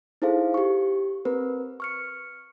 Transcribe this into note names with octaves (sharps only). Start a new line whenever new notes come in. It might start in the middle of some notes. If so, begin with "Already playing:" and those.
D#4 E4 G#4 A4 C5 F5
G4 C#6
C4 A#4 B4
C#6 F6 C#7